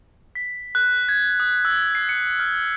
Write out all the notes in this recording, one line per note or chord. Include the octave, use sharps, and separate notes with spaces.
B6
F#6
G#6
D#6
E6
C7
C#7
F6